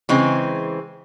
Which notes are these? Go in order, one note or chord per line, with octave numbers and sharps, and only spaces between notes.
C#3 E3 G#3 C4